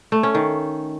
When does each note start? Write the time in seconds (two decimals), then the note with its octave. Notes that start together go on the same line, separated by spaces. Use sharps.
0.12 A3
0.23 C#4
0.35 D#3